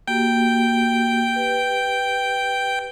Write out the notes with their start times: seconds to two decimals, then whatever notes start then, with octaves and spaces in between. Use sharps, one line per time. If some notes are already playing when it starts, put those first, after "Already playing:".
0.07 A#3 F#4 G4 G5
1.36 G4 B4